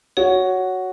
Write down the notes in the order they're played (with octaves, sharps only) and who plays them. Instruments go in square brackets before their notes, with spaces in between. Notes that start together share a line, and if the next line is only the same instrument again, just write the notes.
[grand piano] F#4 [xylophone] C#5